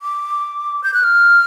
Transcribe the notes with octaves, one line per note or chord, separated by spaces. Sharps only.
D6
G6
F#6
F6